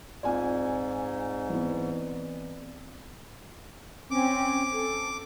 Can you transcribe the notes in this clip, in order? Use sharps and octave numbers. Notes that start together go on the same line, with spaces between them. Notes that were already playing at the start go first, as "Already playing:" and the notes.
G#2 C4 F4 D5 G#5
E3 B3
C4 C#4 D6
A4